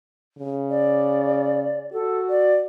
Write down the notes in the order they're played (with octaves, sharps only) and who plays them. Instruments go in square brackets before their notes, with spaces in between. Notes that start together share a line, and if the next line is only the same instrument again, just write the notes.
[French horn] C#3
[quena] D5
[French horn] F#4 [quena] A4
[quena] D5